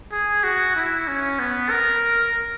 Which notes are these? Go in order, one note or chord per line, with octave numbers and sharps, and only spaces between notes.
G#4
F#4
E4
C#4
B3
A#4